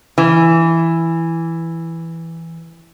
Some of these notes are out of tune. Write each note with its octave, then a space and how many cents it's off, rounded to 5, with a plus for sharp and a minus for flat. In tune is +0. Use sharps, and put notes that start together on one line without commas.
E3 +0